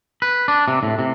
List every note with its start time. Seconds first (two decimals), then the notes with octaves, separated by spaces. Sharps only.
0.22 B4
0.48 D4
0.68 C3
0.83 A2
0.99 C3